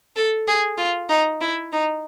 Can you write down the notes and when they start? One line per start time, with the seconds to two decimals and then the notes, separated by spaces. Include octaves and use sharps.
0.16 A4
0.48 G#4
0.78 F4
1.10 D#4
1.41 E4
1.72 D#4